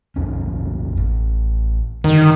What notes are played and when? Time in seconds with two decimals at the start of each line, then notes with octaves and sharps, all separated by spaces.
0.16 B1 F2 C#4
0.97 A1
2.04 G2 D3 D#3